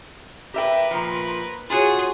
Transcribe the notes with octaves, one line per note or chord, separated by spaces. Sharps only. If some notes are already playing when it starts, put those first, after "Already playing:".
G4 A#4 B4 E5 G5
A#2 F3
F4 F#4 G#4 C#5